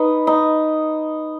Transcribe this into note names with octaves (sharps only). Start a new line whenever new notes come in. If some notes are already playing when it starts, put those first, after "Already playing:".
Already playing: D#4 B4
D#4